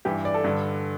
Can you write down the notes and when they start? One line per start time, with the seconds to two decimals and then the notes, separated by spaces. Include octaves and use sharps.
0.05 G2 E3 G4
0.25 D5
0.34 A4
0.44 G2 D3